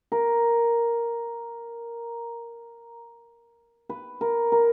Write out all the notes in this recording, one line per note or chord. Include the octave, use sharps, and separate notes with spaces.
A#4
B4
A#4
A#4